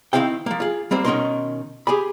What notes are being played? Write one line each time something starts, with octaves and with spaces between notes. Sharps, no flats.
D#3 B3 C4 E4 F5 G5
F3 A#3
F4 G#4
G3 A#3 C4 C5
B2 D#3 C#4 D#4 A#4 C6
G4 G#4 G#5 B5